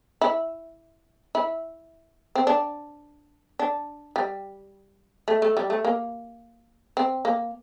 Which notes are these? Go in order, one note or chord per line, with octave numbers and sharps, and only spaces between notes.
E4
E4
C4
D4
D4
G3
A3
A3
G3
A3
A#3
C4
A#3